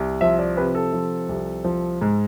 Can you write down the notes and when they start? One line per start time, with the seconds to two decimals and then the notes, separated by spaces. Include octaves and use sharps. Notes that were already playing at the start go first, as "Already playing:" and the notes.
Already playing: C2
0.21 F3 E5
0.39 D5
0.57 C3 B4
0.75 A4
0.93 F3
1.29 C2
1.65 F3
2.01 G#2